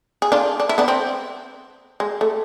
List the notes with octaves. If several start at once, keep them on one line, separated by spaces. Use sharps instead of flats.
G#4
D4 F4
D4
E4
B3 D4
C4
G#3
A3